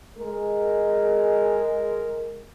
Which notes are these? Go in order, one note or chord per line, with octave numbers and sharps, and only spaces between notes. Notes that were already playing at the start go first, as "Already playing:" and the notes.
G#3 A#4